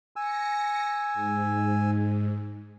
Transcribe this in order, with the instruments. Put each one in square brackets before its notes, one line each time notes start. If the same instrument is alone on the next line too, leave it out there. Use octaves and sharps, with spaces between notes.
[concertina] G#5 E6 [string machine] A#6 C#7
[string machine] G#2